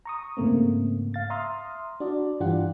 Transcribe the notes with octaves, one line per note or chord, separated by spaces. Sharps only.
A#5 C#6 D#6
G#2 C#3 A3 A#3 C4
F5 A6
E5 A#5 C6 D#6 F6
D4 F#4 D5
G2 E3 D4 F4 G4 F#5